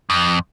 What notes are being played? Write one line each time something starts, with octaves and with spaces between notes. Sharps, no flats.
F2